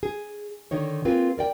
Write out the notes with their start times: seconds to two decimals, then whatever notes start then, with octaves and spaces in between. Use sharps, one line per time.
0.03 G#4
0.71 D3 D#3 D#4 C#5
1.05 A#3 C4 F4 G#4 A#4 B4
1.38 A#4 D5 G5